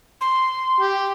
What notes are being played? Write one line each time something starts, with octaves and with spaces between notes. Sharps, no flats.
C6
G4